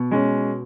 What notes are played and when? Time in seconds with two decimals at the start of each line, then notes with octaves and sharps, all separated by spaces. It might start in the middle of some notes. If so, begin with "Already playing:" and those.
Already playing: B2
0.11 G#3 C#4